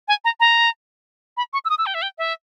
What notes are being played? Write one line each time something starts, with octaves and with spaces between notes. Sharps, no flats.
G#5
A#5
A#5
B5
C#6
E6
D#6
E6
G5
E5
G5
E5